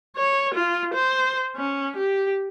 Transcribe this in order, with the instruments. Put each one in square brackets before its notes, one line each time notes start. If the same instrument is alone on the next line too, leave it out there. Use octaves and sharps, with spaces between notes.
[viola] C#5
F4
C5
C#4
G4